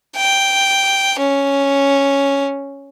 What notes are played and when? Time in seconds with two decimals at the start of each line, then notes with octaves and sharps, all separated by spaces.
0.16 G5
1.19 C#4